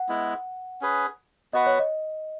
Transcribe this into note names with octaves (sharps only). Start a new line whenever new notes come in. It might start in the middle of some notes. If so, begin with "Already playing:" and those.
Already playing: F#5
G#3 B3 E4
C#4 G#4 B4
B3 F#4 B4 D#5 F#5
C#5
D#5